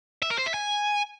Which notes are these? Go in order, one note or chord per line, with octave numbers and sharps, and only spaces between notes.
E5
A#4
C5
E5
G#5